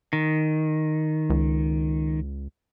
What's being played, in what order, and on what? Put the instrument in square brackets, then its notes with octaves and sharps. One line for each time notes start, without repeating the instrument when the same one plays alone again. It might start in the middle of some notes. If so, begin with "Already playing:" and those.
[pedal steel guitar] D#3
[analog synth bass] C#2